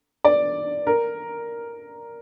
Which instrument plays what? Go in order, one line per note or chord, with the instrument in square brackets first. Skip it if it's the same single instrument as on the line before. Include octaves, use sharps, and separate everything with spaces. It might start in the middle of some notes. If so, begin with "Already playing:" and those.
[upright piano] D5
A#4